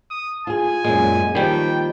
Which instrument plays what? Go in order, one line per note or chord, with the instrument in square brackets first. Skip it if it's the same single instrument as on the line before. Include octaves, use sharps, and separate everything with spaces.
[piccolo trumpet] D#6
[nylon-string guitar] F4 G#4 [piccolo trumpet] G#5
[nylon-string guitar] F#2 A#2 [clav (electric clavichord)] G#3
[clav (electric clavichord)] D#3 G3 [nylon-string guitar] F3 A#3 [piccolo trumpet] G5